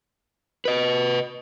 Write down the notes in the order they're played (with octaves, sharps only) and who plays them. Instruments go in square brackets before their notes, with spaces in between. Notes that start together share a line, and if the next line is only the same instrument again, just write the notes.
[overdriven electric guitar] B4 D#5